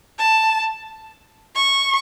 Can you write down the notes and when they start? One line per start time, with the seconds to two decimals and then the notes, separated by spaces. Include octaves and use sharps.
0.19 A5
1.55 C#6